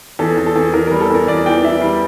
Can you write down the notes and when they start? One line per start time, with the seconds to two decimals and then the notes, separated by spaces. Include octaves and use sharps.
0.19 E2 A4
0.37 E2
0.46 A4
0.56 E2
0.73 E2 A#4
0.87 A#4
0.91 G3
1.01 A4
1.10 E2 A#4
1.28 E2 D5
1.46 E3 G5
1.63 E3 E5
1.81 G3